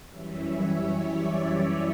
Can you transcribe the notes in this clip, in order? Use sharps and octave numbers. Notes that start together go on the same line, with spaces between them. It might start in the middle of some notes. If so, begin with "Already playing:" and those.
F#2 E3 G3 C#4 E5
C#5
D5